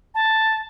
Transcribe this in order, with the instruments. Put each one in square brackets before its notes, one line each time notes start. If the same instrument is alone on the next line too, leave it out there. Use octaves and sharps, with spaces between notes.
[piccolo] A5